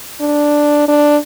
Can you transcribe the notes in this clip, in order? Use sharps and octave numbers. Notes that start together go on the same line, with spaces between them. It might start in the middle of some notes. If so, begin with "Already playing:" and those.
D4
D4